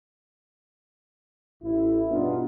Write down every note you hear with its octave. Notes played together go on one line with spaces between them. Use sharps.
A1 E4
G2 B2 B3 D4 D#4 F4